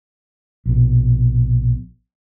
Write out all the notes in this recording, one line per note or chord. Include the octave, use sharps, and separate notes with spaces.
A#1 B2